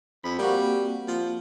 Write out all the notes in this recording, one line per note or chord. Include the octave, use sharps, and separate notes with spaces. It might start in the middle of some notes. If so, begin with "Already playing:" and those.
F2 B5
G3 A#3 C4 F#4
F3